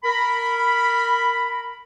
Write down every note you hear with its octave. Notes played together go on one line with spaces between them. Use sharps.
A#4 B5